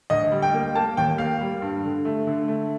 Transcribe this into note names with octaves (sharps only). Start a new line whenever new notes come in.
D2 D#5
G3
G5
A#3
A#3 A5
D#2 G5
A#3 F5
G3
G2
D3
A3
D3
A3